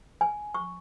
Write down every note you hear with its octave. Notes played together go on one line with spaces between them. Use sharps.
G#5
C#6